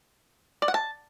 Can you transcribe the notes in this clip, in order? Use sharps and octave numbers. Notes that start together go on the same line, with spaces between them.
D5
F#5
A5